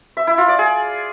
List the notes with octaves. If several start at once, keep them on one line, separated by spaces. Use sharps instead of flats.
E5
E4
F4
D5
G#4